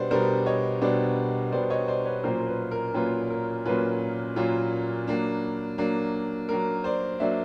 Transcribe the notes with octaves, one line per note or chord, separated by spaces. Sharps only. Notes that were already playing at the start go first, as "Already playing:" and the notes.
Already playing: B2 G3 B3 D4 C5 D5
B2 G3 B3 D4 A#4 C5
C#5 D#5
B2 G3 B3 D4 C5 D5
B2 G3 B3 D4 C5 D5
C#5 D#5
C5 D5
B4 C#5
A#2 F#3 A#3 C#4 F4 A#4 C5
A#4
B4
A#4
A#2 F#3 A#3 C#4 F4 B4
A#4
A#2 F#3 A#3 C#4 F4 B4
A#2 F#3 A#3 C#4 F4
F#3 A#3 D4
F#3 A#3 D4
F#3 A#3 D4 A#4
C5 D5
F#3 A#3 D4 D5 E5